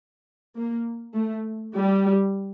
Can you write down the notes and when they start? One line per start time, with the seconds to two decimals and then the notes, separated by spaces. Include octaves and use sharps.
0.56 A#3
1.15 A3
1.76 G3